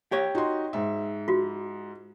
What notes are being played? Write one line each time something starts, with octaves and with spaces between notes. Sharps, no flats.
G4 C#5
D#4 F#4 C6
G#2 E5
F4 F#4